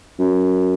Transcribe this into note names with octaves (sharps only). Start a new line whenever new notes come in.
F#2